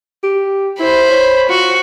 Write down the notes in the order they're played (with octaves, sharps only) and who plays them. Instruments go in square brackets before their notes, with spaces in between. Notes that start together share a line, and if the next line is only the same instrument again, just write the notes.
[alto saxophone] G4
[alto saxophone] E4 [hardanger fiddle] C5 B5
[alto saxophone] C#5
[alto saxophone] F4 [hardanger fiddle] F#4